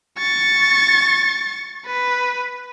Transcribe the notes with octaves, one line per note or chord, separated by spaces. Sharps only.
C#6 A6
B4